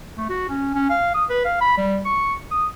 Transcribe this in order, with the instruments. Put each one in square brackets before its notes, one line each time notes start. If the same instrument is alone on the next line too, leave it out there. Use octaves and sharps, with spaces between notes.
[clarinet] A3
F#4
C#4
C#4
F5
D#6
B4
F5
B5
G3
C#6
D#6